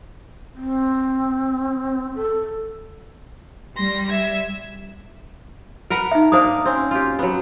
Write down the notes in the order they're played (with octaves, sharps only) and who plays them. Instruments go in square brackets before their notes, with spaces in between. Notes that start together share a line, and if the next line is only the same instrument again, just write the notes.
[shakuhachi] C4
A4
[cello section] G3 [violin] C6 A#6
[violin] E5 G#6
[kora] A#4 B4 F#5
[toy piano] D#4 E5
[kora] A#3 D4 D#4 [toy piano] C5 D#6
[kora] C4 C#4
F4 G4
F#3 B3